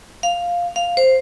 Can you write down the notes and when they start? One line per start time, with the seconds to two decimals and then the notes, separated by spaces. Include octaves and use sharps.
0.23 F5
0.76 F5
0.97 C5